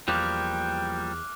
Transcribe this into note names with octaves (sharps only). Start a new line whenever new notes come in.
E2 F3 G3 A#3 G5 D6 F6 F#6